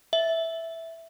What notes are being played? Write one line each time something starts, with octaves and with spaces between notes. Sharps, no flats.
E5